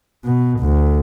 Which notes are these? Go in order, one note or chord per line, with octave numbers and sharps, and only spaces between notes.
B2
D2